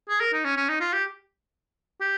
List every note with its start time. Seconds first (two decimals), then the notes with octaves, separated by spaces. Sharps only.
0.09 G#4
0.21 A#4
0.33 D#4
0.45 C#4
0.57 C#4
0.69 D#4
0.80 F4
0.93 G4
2.01 G4